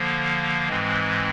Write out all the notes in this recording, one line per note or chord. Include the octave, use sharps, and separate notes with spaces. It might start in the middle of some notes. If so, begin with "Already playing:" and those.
Already playing: D3 F3 A#3
G#2 E3 G#3 C4